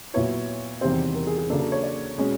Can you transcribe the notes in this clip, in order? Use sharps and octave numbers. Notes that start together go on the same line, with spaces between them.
A#2 F#3 B3 E4 C#5
E2 C3 D#3 G3 C4 C5
A#4
G#4
G#4
C#3 F#3 A#3 D4 A4
A4
C#5
D5
B2 G#3 C#4